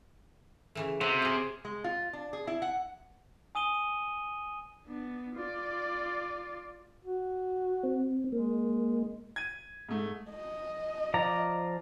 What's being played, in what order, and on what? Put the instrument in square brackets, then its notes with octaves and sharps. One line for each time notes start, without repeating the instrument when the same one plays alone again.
[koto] C#3 E3 A3
[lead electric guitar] C3 [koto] F#4
[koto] F4 G#4
[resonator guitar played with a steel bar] G#3
F4
D4
G#4
E4
F#5
[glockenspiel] G#5 D#6 D#7 G7
[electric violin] B3 D4
F4 D5
[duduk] F#4
[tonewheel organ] C4
[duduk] G#3 [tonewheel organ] A#3
[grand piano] G#6 D#7
G#2 A3
[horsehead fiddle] D#5
[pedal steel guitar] F3 D5 A#5